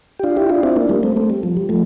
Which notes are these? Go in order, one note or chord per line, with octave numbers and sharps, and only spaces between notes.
G4
D4 F4
E4 G4
D4 F4
C4 E4
A#3 D4
G3 A#3
A3 C4
A3 C4
G3
F3
G3
F3 A3